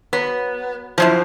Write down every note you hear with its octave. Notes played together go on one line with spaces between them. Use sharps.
F#3 B3
F#2 A#2 F3 E4 C5